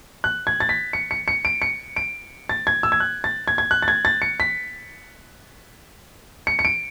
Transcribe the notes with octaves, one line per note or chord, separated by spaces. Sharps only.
F#6
G#6
A6
B6
C#7
C#7
C#7
D7
C#7
D7
A6
G#6
E6
G#6
F#6
A6
G#6
G#6
F#6
A6
G#6
A6
C#7
B6
C#7
C#7
D7